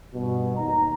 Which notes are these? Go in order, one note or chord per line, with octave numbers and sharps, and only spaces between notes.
G2 B2
D#2 D#4 A#5